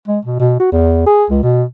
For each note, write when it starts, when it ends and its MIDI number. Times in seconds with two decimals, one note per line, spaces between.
0.07 0.19 56
0.25 0.38 47
0.39 0.55 47
0.59 0.67 66
0.72 1.02 40
1.06 1.25 68
1.30 1.41 37
1.43 1.63 47